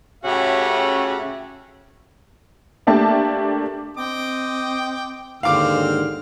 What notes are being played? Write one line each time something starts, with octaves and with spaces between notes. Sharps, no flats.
A2 C#3 C#4 F#4 G4 E5
A3 A#3 D4 G4 E5 A5
C4 D#5 G5 D6
D#2 G#2 D3 C4 G#4 F5 D6 F6